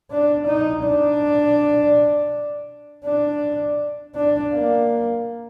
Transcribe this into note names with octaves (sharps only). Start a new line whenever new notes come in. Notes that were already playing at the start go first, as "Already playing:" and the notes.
D4
D#4
D4
D4
D4
A#3